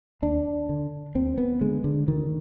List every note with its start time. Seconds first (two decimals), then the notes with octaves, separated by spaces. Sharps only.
0.22 D#2 D4
0.69 D3
1.15 D#2 C4
1.38 B3
1.61 D3 G#3
1.84 D3
2.07 D2 D#3